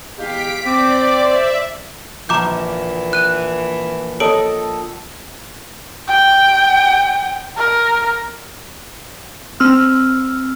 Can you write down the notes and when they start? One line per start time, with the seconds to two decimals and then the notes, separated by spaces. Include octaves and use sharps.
0.18 E2 G#3 G4 F5 B6 D7
0.65 C4 D5 D6
1.23 C5 E5
2.29 A#1 E3 A#5 D6 G6
3.13 F#6 D#7
4.20 A4 C#5 D#5 D7 F#7
6.08 G5
7.57 A#4
9.60 C4 E6 F6